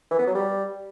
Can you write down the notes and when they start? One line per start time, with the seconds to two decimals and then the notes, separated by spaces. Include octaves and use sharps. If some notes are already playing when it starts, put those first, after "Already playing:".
0.11 E3
0.19 B3
0.27 F#3
0.35 G3